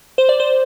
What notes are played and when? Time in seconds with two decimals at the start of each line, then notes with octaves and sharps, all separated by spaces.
0.18 C5
0.29 D5
0.40 C5